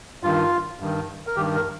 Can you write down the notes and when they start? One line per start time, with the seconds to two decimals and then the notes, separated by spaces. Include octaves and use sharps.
0.23 G2 D#3 F4
0.80 G2 D#3
1.27 A#4
1.36 G2 D#3 G4
1.55 A#4